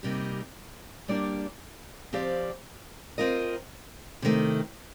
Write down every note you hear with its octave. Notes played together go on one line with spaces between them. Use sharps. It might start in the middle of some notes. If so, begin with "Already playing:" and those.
C3 G3 A#3 D#4 G4
G3 A#3 D4 G4 D5
F3 C4 G4 D5 F5
C4 F4 A#4 D#5
C3 D#3 A3